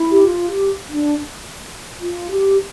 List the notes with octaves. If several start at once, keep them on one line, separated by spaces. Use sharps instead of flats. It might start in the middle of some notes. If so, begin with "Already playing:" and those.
Already playing: E4
G4
F4
G4
D4
F4
G4